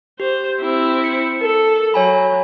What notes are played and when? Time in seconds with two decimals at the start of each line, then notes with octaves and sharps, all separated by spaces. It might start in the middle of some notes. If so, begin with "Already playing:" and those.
0.20 G4 C5
0.61 C4 E4
1.04 C#7
1.41 A4 A#4
1.94 F#3 C#5 G#5 B5